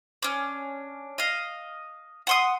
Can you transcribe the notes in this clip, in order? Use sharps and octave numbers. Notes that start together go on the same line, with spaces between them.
C#4 D4
D#5 F5
F#5 C6 D#6